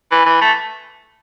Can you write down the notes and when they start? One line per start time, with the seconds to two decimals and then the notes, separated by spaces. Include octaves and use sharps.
0.12 E3
0.26 E3
0.41 A3